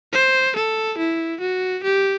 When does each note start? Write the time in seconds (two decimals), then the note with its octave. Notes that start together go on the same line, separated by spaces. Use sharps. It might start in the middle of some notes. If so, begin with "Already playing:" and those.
0.13 C5
0.56 A4
0.99 E4
1.41 F#4
1.84 G4